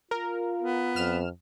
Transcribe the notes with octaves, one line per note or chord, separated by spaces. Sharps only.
F4 A#4
B3
F2 F6 E7